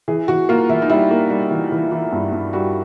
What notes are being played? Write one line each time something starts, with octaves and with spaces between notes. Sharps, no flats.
E3 G#4
E3 F#4
A#3 F4
E3 E4
D#4
G3 E4
A#3
G3
E3
E3
E3
G2
G2
G3 F#4